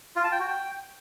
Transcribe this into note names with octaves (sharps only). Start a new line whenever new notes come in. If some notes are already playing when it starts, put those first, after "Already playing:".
F4
A5
G5
F#4
G5